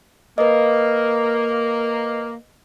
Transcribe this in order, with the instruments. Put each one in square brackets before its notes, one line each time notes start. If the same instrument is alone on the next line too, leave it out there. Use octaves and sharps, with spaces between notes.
[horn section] A#3 [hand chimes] B4 D#5